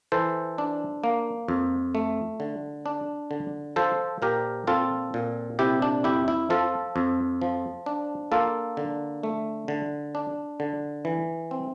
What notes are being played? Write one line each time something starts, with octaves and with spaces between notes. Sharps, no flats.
E3 A4 C5
D4
A#3
F2
A3
D3
D4
D3
F3 A4 C5
A#2 G4 A#4
C4 F4 A4
A#2
C3 E4 G4
D4
F2 E4 G4
E4
F3 F4 A4
F2
F3
D4
A#3 F4 A4
D3
A3
D3
D4
D3
E3
C4